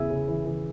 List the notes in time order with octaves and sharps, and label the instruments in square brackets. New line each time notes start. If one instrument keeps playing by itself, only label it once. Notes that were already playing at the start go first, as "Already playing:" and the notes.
Already playing: [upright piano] E2 C#3 [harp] E4 G#4
[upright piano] C#3
E3
E3